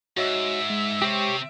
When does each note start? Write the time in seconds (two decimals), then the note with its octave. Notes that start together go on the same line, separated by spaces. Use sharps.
0.17 G#2 F#4 C#5 D#5 E5
0.70 G#3
1.02 C3 C4 G4 C5 C#5